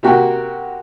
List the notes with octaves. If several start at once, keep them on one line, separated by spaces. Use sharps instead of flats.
C3 A#3 F#4 G5